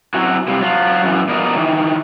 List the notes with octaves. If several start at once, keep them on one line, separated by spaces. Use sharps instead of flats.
F#3 C4 C#4 E4 F#4
C3 G3 C4 E4 F4
F#3 F4
F#2 E3
F3 B3 A#4 D5 D#5
D#3 E3